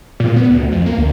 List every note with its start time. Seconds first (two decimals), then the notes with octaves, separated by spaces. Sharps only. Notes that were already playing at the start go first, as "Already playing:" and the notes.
0.20 A#2
0.36 B3
0.50 D2
0.72 F2
0.86 A#3
0.98 D2